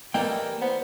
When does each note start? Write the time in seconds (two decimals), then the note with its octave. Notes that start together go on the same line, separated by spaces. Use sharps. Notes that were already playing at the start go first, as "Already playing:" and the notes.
0.14 E3 G3 A#3 A4 D#5 G5
0.61 B3 C5